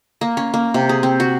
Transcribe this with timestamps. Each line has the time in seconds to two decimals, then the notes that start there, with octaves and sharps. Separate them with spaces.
0.21 A#3
0.37 C#4
0.54 A#3
0.74 C3
0.89 G#4
1.03 C4
1.20 F#4